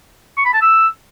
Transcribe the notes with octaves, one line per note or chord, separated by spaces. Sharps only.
C#6
B5
A5
E6